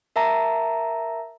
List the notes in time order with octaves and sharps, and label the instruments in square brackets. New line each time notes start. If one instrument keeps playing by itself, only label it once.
[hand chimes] A#4 E5 A5 A#5